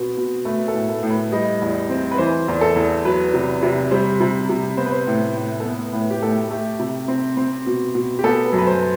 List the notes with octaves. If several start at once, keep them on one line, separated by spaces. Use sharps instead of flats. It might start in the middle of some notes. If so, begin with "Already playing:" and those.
Already playing: B2 B3 C4
B2
A3 B4
A4
A2
A4
A2
B4
G3 D#5
E2
C4
B4
E3 C5
E2
A4
E2
F#3 B4
C3
C3
G3 C5
C3
C3
B3 C5
B4
C5
A2
A2
A4
B3 B4
A2 B4
G4
A2 A4
A3 G4
C3
C4
C4
B2
B2
G4
B3 A4
B4
F#2
B4
C5